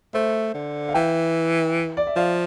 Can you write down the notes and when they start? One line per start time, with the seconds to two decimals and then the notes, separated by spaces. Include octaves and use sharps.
0.13 A3 C5 E5
0.54 D3
0.89 F5
0.94 E3 E5 G5
1.97 D5
2.07 E5
2.16 F3 D5 F5